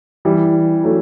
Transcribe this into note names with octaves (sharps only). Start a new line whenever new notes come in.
E3 G3
F#3 A3